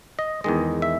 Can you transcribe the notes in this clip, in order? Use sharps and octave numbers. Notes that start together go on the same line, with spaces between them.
D#5
E2 D#3 G#3 D#5
E5